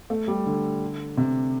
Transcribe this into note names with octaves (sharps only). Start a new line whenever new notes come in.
A3
G3
D3
C3